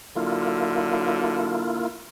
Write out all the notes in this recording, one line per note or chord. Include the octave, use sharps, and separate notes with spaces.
D3 F#3 A#3 E4 F4